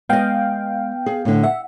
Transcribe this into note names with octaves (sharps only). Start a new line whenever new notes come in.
G#3 B3 D#5 F5 G5
G#4
A2 D3
E5 F#5